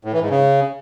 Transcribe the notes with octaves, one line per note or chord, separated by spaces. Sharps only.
A2
E3
G#2
C#3